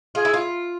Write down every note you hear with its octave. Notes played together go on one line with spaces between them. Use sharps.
F4 G#4
E4
F4